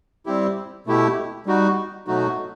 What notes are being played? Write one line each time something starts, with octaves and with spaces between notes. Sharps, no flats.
G3 C4 E4 G4
B2 A3 E4 G4
G3 D#4 F#4
B2 F#3 A3 D#4 F#4